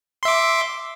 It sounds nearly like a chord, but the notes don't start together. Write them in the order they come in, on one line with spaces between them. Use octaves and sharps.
C6 E5 D6